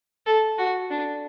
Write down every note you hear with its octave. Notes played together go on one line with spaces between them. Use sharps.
A4
F#4
D4